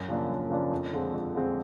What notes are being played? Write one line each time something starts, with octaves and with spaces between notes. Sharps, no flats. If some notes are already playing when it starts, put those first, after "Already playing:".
Already playing: F#2
C#3 F3 A#3 D4
F#2
C#3 F3 A#3 D4
F2
D3 F3 G#3 C4
F2
D3 F3 G#3 C4